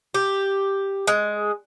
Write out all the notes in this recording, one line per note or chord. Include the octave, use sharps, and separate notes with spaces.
G4
G#3